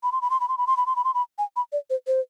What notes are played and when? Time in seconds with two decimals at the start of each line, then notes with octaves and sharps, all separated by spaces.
0.03 B5
0.12 C6
0.22 B5
0.30 C6
0.40 B5
0.49 C6
0.58 B5
0.67 C6
0.77 B5
0.86 C6
0.96 B5
1.04 C6
1.14 B5
1.38 G#5
1.56 B5
1.72 D5
1.90 C5
2.07 C5